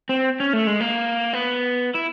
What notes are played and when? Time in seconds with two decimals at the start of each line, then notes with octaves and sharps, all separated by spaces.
0.09 C4
0.40 C#4
0.53 A3
0.67 G#3
0.81 A#3
1.33 B3
1.94 E4